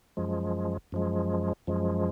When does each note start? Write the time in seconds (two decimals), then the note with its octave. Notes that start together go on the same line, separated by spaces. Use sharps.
0.17 F#2 F3 G#3
0.92 F#2 F3 G#3
1.67 F#2 F3 G#3